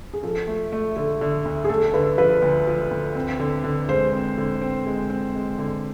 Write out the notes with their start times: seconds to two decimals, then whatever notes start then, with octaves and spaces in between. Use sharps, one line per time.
0.13 G#4
0.23 F3 A4
0.47 A3
0.72 A3
0.96 D3 A4
1.21 D3
1.45 D2
1.64 G#4
1.69 A3 A4
1.94 D3 B4
2.18 F3 B4
2.42 D2
2.67 F3
2.91 D2
3.15 C4
3.39 D3
3.64 D3
3.88 G#3 C5
4.13 C4
4.38 D3
4.62 C4
4.86 G#3
5.10 C4
5.35 G#3
5.59 D3